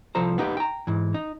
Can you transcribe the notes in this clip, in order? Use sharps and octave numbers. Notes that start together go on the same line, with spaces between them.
C2 F3 A4 C5 A#5
B3 D#4 G4
G5 A#5
G#2 E3
D#4